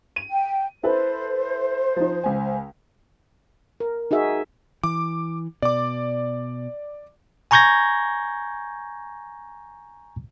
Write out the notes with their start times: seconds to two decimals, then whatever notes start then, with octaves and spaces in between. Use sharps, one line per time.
0.16 D#7
0.31 G5
0.83 E4 A4 B4 C5
1.96 F3 D#4
2.24 C#2 G#5
3.80 A#4
4.11 D#4 F#4 G#4 E5
4.84 E3 D6
5.62 B2 D5 D6
7.51 G#5 A#5 C#6 G6 G#6 A#6